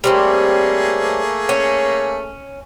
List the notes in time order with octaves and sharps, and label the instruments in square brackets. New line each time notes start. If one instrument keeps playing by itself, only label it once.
[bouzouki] G3 C4 C#4 [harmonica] A3 A#3 G#4
[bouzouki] C#4